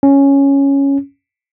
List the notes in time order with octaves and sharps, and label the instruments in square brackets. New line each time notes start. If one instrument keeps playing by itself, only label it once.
[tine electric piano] C#4